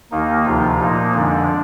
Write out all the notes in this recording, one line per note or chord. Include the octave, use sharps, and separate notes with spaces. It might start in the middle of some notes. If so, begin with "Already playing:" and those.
D#2 D#3 A#3 D#4
D2 C3 F3 F4
A#2 F3 A#3 D#4
F2 D3 F3 G#3 D4